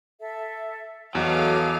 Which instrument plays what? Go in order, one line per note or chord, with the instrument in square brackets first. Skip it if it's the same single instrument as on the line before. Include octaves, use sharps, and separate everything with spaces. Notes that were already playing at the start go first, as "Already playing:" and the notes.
[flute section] A4 E5
[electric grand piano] E2 [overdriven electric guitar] F#3 [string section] G#4 A4 F5 [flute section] D#5 D6 D#6